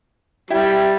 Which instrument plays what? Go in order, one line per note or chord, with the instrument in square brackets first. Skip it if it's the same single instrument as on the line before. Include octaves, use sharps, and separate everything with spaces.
[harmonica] G3 [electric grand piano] E4 E5 G5